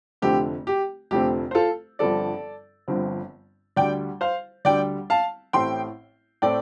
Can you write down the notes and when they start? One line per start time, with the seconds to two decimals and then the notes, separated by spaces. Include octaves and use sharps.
0.22 F1 F2 D3 A3 C4 G4
0.67 G4
1.11 F1 F2 D3 A3 C4 G4
1.51 C5
1.55 F4 A4
1.99 G1 G2 D3 F3 C4 A4 D5
2.88 G1 G2 D3 F3 C4
3.76 D2 D3 G3 D5 G5
4.21 C5 F5
4.65 D2 D3 G3 D5 G5
5.10 F5 A5
5.53 A1 A2 A3 C4 G5 C6
6.42 A2 A3 C4 D5 G5